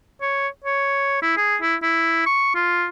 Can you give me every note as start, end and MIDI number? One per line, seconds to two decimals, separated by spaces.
0.21 0.48 73
0.64 1.21 73
1.22 1.33 64
1.37 1.56 68
1.62 1.75 64
1.83 2.22 64
2.26 2.55 85
2.55 2.86 65